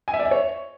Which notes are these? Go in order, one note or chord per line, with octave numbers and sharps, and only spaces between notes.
G#5
E5
D5
E5
C#5